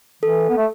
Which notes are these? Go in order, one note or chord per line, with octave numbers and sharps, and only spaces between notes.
E3 A4
B3
A3